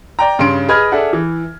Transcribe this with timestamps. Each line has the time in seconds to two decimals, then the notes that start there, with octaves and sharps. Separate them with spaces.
0.19 D5 G5 A#5
0.39 G2 C#3 C6 D7
0.68 G#4 B4 D#5 B5 F6 G#6
0.92 D4 G#4 A4 E5 F#5
1.13 E3